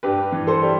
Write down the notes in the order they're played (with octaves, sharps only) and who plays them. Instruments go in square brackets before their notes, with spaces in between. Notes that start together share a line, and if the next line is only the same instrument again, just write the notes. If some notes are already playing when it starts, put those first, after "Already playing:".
[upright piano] G2 G4 B4
E3
A4 C5
G3